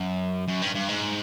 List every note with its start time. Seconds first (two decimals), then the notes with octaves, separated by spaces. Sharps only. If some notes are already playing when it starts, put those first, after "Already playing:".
Already playing: F#2
0.48 F#2
0.62 G2
0.75 G2
0.89 G#2